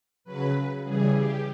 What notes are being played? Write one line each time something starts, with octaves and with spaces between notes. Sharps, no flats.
C#3 F#3 B4
C#3 E3 G3 G#4
G4